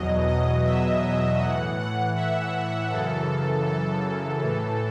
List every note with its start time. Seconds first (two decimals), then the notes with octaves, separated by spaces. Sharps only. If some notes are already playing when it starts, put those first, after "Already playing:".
Already playing: E2 B2 F#3 D#5
0.27 D#5
0.64 E5
1.40 A2 E3 F#5
1.78 F#5
2.16 E5
2.90 F#2 C#3 E3 A4
3.66 A4
4.41 A2 E3